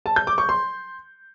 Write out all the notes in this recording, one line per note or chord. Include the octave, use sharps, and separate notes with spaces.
A5
G6
D6
C#6
C6